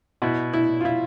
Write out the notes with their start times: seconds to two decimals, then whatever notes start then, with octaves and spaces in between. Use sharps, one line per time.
0.22 B2 E4
0.54 E4
0.81 F4
0.85 E4